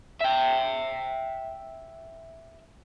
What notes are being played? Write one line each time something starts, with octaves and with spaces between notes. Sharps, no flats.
E5 G5